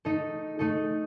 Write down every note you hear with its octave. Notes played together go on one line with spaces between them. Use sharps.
A3 D#4 A4
A3 D#4 A4